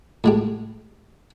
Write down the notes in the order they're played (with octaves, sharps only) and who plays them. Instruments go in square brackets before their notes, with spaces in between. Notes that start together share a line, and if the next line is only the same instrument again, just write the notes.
[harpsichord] A2 G#3 G4